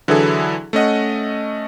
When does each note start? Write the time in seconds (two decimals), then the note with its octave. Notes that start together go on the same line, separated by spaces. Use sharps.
0.08 D3 E3 F#3 E4 G#4 A4
0.73 A3 C#4 D#5 F#5